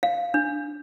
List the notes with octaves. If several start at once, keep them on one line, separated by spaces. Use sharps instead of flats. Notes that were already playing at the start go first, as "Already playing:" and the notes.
F5
D4